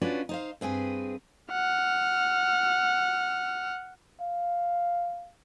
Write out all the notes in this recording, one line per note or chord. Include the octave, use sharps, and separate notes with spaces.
C#4 D4 F4 F#4 B4 D5
D#4 C5 F5
G2 C4 G#4 B4
F#5 F6
F5